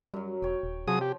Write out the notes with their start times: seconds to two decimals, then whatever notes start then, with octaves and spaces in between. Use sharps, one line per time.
0.14 F#2 F#3 G3
0.42 E1 C#5 G5
0.63 D#1
0.88 C3 F3 F#3 G#4 D#6
1.01 G4